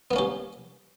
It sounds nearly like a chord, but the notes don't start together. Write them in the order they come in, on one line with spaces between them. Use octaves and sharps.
B3 A#3 C#4 G4